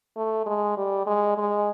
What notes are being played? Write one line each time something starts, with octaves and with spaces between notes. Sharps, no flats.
A3
G#3
G3
G#3
G#3